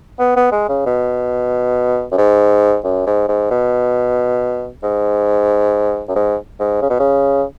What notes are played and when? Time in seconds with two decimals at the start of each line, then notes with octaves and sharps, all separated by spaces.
0.19 B3
0.36 B3
0.52 G#3
0.69 C#3
0.86 B2
2.12 F#2
2.17 G#2
2.84 F#2
3.06 G#2
3.28 G#2
3.50 B2
4.83 G#2
6.08 F#2
6.16 G#2
6.59 G#2
6.81 C#3
6.90 B2
7.00 C#3